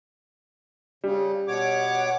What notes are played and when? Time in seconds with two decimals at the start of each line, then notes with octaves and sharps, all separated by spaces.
1.04 C#3 G3
1.48 B2 C#5 F#5 D6